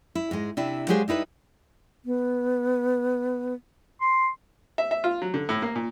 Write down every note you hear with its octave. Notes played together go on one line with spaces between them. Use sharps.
E4
G#2 G#3
C3 D4 E4
F#3 G#3 G4 G#4 C5 F5
G3 D#4 E4 B4
B3
C6
E5
E5
F4
F#3
D3
A2
A#3
A#2